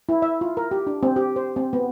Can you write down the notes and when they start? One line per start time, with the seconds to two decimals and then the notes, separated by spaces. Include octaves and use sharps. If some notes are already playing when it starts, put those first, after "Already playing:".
0.09 E4
0.22 E5
0.41 F4
0.57 A#4
0.71 G4
0.87 D4
1.03 C4
1.16 G4
1.36 C5
1.56 C4
1.73 B3